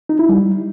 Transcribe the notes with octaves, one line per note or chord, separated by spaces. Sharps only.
D#4
E4
G3